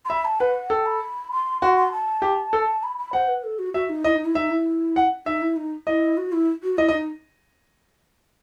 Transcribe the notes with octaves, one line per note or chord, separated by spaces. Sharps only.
C6
E5 B5
A5
B4 F#5
A4 G5
B5
C6
F#4 C6
C6
A5
G4
A4
B5
B5
C5 F#5
B4
A4
F#4
F#4 E5
D#4
E4 D#5
D#4
E4
D#4 E5
E4
F#5
D#4 E5
E4
D#4
E4 D#5
F#4
E4
F#4
E4 D#5
D#5
D#4